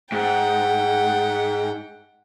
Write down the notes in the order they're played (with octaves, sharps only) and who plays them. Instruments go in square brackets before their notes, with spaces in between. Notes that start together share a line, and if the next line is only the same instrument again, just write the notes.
[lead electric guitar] G#2 [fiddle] F#5 G5